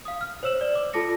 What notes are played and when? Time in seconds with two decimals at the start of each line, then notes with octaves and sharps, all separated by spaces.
0.05 F5 D#6
0.21 F6
0.43 C5 C#5 E6 E7 F#7
0.61 D5
0.75 D6
0.93 F4 A4 A5 D6 A#6 C#7